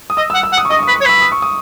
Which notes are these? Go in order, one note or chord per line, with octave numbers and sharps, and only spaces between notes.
D#6
D#5 E6
E6
F#5
E6
F#5
D#6
C#6
D#5 D#6
C#6
D#6
B4
C#6
C#5
B4 E6
D#6
C#6
D#6